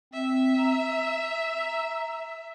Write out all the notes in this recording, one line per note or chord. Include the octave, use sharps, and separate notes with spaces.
C4 E5
A#5